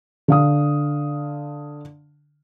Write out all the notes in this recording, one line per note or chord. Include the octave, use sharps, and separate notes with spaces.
D3 F5 D#6